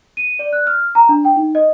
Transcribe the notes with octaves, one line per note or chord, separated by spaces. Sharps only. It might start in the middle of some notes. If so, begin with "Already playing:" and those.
D#7
D5
F#6
F6
A#5
D4
G5
D#4
D#5